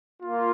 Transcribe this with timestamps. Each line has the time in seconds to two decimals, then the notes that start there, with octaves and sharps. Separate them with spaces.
0.22 A#3 F4